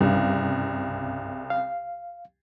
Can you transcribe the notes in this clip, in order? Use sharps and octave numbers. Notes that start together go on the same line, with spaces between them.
C2 G2 C#3
F5